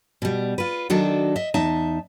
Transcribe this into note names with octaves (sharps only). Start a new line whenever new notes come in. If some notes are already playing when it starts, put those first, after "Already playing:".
B2 G3
F4 B4
D#3 F#3 D4 F#4 A4
D#5 E5
E2 D#4 E5 A5